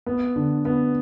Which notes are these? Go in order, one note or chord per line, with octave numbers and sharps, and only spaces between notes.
B3
D3
B3